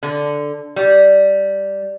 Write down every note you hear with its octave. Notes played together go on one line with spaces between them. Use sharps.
D3
G3